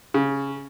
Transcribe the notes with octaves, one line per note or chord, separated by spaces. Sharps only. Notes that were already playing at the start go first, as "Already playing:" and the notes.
C#3